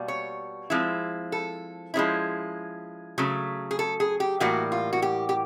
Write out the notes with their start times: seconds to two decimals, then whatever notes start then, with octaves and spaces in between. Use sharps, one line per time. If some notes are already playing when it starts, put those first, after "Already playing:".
Already playing: B2 G3 A#3
0.08 C#5
0.70 F3 G#3 C4 E4
1.32 A4
1.94 F3 G#3 C#4 E4
3.18 C#3 F#3 A3
3.71 G#4
3.79 A4
4.00 G#4
4.20 G4
4.40 A2 E3 G3 A#3 F#4
4.72 F4
4.93 F#4
5.02 G4
5.29 G4